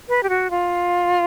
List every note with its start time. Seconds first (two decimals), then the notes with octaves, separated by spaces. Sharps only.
0.09 B4
0.23 G4
0.29 F#4
0.51 F4